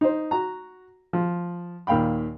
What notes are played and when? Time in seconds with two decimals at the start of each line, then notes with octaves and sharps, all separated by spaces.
0.01 D#4 C5
0.31 F#4 A#5
1.13 F3
1.87 D#2 A#2 F5 G5 B5